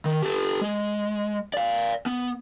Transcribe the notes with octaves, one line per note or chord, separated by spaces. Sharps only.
D#3
G4 A4
G#3
D5 F5
B3